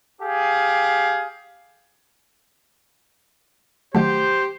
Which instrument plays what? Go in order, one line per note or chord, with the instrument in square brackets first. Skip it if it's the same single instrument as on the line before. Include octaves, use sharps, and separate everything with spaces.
[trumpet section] G4 G#4 F5
[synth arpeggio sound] D#3 F#3 A3 [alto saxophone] G4 [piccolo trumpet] C5